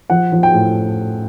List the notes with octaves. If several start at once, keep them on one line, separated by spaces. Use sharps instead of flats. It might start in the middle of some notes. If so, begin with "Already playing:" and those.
F3 F#5
F3
G5
A2